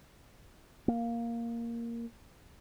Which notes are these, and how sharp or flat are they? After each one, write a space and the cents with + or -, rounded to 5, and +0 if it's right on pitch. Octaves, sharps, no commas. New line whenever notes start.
A#3 +0